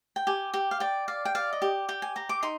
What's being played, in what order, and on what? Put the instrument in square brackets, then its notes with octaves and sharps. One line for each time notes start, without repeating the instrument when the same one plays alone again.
[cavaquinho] G5
G4 G#5
G4 G5
F5
D5 G5
D5 F5
G5
D5 F5
D#5
G4
G4 G5
G#5
G4 A#5
D6
D#4 C6